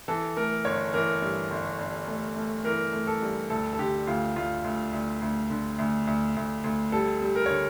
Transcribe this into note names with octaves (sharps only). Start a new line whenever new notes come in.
E3 A4
A3 A#4
G1 C#5
E3 A#4
G2
G1
G1
A3
A3
E3 A#4
A3
A4
G2
D2 A4
A4
D3 G4
D2 F4
D2 F4
D2
D2
D2
D3
D2
D2
D2
D2
G3 A4
G3
A#4
D3 C#5